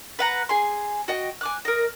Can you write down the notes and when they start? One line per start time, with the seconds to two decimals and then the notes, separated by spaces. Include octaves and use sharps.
0.19 B4 F#5 A#5
0.49 G#4 G#5 C6
1.08 F#4 D#5 G5
1.41 G#5 D6 F#6
1.65 A#4 D#5